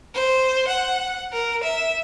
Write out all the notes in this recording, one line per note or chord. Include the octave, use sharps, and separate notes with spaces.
C5
F#5
A#4
E5